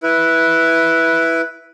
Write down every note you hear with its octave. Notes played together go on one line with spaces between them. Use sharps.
E4 B4